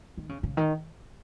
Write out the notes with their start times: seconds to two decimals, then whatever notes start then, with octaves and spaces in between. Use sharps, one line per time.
0.18 D#3
0.29 C#3
0.43 C#3
0.57 D#3